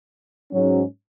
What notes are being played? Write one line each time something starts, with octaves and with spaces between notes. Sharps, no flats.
G#2 F#3 C#4